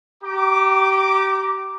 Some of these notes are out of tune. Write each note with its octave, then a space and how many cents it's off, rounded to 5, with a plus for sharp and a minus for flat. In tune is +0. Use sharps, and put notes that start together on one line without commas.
G4 -30 A#5 +0 D6 +0